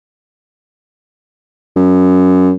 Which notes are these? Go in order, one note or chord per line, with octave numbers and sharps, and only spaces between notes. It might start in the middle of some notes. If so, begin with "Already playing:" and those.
F#2